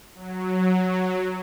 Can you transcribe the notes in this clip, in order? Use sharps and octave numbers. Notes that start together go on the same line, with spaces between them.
F#3